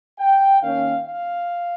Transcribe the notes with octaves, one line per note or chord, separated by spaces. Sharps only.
G5
D#3 A#3 C#4 F5
F5